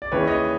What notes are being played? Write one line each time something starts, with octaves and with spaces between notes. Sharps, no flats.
D5
D#2 C#3 E3 B4 C#5
C#5 D#5